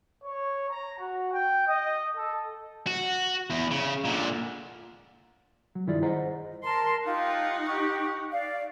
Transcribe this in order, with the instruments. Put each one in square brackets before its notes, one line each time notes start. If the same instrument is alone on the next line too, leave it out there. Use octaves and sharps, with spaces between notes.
[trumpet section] C#5
A#5
F#4
G5
D#5
A4
[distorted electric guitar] F#4
E2
C#3
A#2 D3
[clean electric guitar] F#3
G2 D#3 E4 F4 G#4 D5
G#4 C5 D#5 F#5 A#5
[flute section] A#4 A5 [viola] C6
[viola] D#4 F#5 [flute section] F4 G4
[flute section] G4 C#6
D5 F5